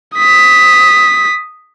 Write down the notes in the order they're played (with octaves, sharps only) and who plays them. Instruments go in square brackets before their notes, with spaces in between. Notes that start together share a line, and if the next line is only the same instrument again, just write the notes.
[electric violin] D#6 B6